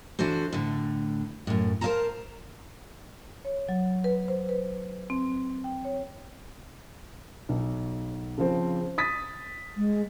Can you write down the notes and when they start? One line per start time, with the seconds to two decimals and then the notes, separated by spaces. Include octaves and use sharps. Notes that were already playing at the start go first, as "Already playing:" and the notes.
0.19 E3 D4 F#4 A4 C5
0.52 A2 D3
1.47 F#2 A2
1.81 A#4 C5 D#5 F5 A5 A#5
3.45 C#5
3.69 F#3
4.04 B4
4.28 C5
4.49 B4
5.10 C4
5.64 G5
5.85 C#5
7.49 B1
8.38 C#3 F3 C4
8.98 D#6 A6 B6
9.77 G#3